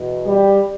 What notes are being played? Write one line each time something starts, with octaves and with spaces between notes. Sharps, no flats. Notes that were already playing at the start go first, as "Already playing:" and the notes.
Already playing: E2 B2
G3 G4